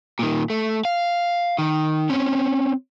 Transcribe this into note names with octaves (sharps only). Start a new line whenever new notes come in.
A#2 D#3
A3
F5
D#3
C4 C#4